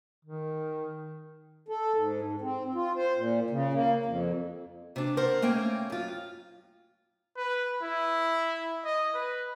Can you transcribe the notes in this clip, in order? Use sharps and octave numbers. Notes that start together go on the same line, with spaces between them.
D#3
A4
G#2
G#2
C4
F4
C5
A#2
C#3
A#3
F2
C3 D4
A#4 C5 F#5
A3 A#3 C#4 G5
F#2 F4
B4
E4
D#5
B4